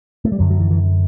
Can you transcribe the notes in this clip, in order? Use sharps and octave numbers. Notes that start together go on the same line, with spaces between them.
A3
G3
F#2 D3 F#3
F#3
E3
E3